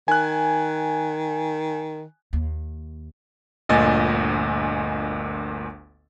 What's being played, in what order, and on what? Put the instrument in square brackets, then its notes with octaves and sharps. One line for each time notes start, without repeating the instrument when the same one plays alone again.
[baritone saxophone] D#3 [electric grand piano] G#5 F#6
[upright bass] D#2
[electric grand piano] G1 D2 A#2 D#5 G#5 A6